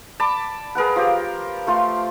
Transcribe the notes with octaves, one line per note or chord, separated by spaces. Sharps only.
D5 A5 B5 D6
G#4 A#4 B4 F#5
F3 G4
A3 F4 C6